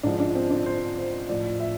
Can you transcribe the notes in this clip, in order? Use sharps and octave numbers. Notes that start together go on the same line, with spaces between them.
G#2 F3 D4
D4
C4
D4
C5
C5
A2 F3 D5
E5